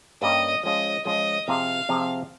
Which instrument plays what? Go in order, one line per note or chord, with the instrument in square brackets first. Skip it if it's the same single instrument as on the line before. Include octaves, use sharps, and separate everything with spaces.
[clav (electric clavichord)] G2 G3 A#3 C#4 G4 [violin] D#5
[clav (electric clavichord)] F3 G#3 C#4 F4 [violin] D#5
[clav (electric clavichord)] F3 G#3 C#4 F4 [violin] D#5
[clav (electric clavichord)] C3 F3 C4 F4 G#4 [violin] F5
[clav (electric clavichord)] C3 F3 C4 F4 G#4